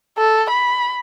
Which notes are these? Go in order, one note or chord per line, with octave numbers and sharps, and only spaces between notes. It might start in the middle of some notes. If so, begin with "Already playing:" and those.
A4
B5